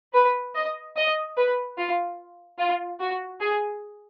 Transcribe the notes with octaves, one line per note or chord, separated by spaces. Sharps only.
B4
D#5
D#5
B4
F4
F4
F#4
G#4